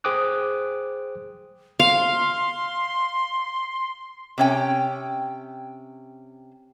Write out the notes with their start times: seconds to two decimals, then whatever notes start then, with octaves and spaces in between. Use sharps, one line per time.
0.04 G#4 C5 G5 D6 D#6 F#6
1.80 F5 C6
4.38 C3 C#4 G5